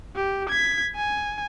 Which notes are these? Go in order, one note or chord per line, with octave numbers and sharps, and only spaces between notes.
G4
G#6 B6
G#5